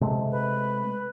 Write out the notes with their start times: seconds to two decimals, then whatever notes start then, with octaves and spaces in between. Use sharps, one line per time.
0.01 C3 G#3 A3
0.31 B4